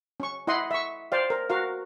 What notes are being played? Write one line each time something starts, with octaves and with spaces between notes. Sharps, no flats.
C#4 C#6
E4 D#5 F#5 C6
E5 C#6
C5 D5 F5
A#4
F#4 A#4 F5